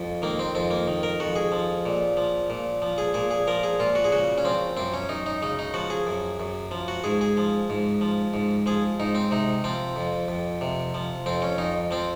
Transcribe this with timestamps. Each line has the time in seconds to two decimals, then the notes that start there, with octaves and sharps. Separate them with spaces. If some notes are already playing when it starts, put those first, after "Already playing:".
Already playing: F2
0.22 D#3 A#3
0.39 C4
0.55 F2 C4
0.71 A#3
0.88 D#3
1.03 A#4
1.20 F2 F#4
1.36 G#4
1.52 F3
1.85 A#2
2.17 F3
2.50 A#2
2.82 F3
2.98 G#4
3.14 A#2 G#4
3.31 G#4
3.47 F3 A#4
3.63 G#4
3.80 A#2 F4
3.95 F#4
4.05 G#4
4.12 C#3 F#4
4.38 C#4
4.45 F3 C4
4.77 F#2 C4
4.94 C#4
5.09 F#2 D#4
5.26 D#4
5.42 C#3 D#4
5.59 D#4
5.74 F3 F#4
5.90 G#4
6.07 F#2
6.40 F#2
6.71 F3
6.88 F#4
7.04 G#2 G#4
7.21 G#4
7.37 F3
7.70 G#2
8.01 F3
8.34 G#2
8.66 F3 G#4
9.00 G#2 D#4
9.15 C4
9.31 C3 D#4
9.64 F3 C4
9.96 F2
10.28 F2
10.61 C3
10.94 F3
11.26 F2 C4
11.42 C#4
11.58 F2 D#4
11.91 F3 C4